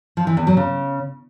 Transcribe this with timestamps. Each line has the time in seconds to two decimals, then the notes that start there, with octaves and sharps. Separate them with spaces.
0.17 F3
0.27 E3
0.37 E2
0.47 F#3
0.57 C#3